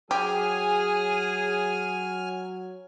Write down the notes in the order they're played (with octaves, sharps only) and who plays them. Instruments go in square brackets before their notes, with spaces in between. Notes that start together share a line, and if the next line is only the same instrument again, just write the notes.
[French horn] F#3 [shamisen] G4 [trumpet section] G#4 [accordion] G#5 F6